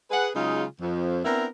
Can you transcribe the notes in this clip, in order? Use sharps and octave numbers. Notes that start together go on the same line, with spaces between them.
G#4 B4 F#5
C#3 F#3 G#3 D#4 F4 G#4
F2
B3 C4 D4 E4 A#4